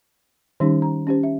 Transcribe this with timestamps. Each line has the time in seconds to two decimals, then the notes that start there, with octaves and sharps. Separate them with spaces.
0.60 D#3 G3 C#4 D#4 G4
0.82 A#5
1.07 C#4 G4 C5
1.23 E5